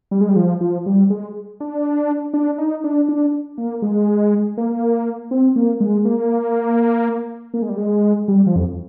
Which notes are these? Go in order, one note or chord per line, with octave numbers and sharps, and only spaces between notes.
G3
G#3
G3
F3
F3
G3
G#3
D4
D4
D#4
D4
D4
A#3
G#3
A#3
C4
A#3
G#3
A#3
A#3
G#3
G3
G#3
G3
F3
F2